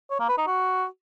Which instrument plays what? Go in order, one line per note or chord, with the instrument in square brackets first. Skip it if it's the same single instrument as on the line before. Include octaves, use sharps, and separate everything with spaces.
[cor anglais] C#5
A#3
B4
D#4
F#4